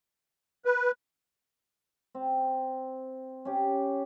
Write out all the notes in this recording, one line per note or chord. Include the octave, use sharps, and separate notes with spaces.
B4
C4
C#4 G4